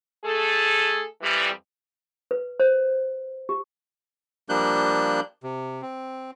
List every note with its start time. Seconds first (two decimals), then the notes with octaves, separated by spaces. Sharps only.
0.25 A3 G#4 A4
1.23 F2 E3 G3
2.31 B4
2.60 C5
3.49 G4
4.49 F3 G3 A#3 D4 F#6 G6
5.43 C3
5.82 C4